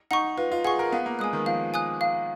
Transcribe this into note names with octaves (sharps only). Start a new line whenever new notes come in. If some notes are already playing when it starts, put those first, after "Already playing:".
D#4 F#5 C#6
F4 B4
F4
G#4 F#5 C#6
A#4
B3 F5
A#3
G#3 G#5 D#6 F#6
D#3
F3 F5
G#5 D#6 F#6
F5